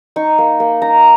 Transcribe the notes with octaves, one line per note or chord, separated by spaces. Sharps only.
D#4 C#6
A#3
A#3
D#4 A#5